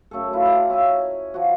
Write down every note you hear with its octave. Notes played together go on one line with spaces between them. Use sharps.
F#2 A3 G#4 A4
E4 F4 B4 E5
A4 D5 G5 A#5
C#5 E5 F5 G#5
F3 F#4